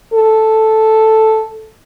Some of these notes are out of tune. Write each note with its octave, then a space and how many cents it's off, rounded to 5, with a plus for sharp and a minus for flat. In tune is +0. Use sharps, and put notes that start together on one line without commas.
A4 +0